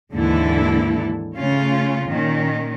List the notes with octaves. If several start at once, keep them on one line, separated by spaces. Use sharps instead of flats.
D#2 G#2 D3 E3 E4 A4
C#3 A3 C#4 F4
A#2 D#3 C#4